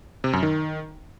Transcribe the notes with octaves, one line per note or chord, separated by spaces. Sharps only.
C3
F#2
D#3